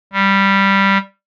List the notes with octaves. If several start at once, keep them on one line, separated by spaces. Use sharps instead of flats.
G3